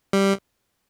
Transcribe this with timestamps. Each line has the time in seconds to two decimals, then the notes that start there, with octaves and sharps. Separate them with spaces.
0.13 G3